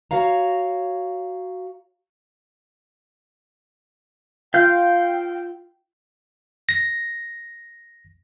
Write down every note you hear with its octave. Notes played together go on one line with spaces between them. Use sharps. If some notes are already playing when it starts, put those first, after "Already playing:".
F#4 C#5 F5 A#5
F4 F5 G5 G6
A#6